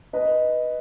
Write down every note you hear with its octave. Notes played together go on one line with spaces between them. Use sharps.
B4 D#5